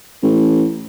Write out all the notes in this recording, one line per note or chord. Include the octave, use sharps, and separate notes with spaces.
A1